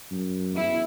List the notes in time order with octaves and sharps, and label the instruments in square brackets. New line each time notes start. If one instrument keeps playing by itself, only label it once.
[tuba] F#2
[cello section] E2 E4